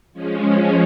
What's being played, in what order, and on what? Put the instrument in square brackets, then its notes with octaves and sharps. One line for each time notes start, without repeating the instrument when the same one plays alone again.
[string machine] F3 G#3 C#4